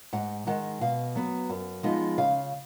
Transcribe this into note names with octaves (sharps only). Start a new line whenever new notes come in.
G#2 F#5
D#3 G#3 F#5
B2 F5
F#3 B3
F#2
F3 G#3 B3 D#4
C#3 F5